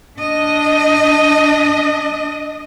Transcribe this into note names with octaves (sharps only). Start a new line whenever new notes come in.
D4 D#5